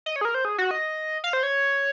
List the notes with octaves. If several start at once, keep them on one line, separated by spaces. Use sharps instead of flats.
D#5
C#5
G#4
A#4
C5
G#4
F#4
D#5
F5
C5
C#5